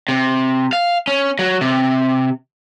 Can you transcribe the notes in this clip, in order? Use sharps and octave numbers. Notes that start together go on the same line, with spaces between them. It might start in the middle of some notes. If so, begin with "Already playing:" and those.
C3
F5
C#4
F#3
C3